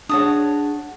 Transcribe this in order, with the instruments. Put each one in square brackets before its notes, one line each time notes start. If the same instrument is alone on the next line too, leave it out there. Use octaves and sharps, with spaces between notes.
[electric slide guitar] D4 G#4 C#5 [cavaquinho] F#4 A5 D#6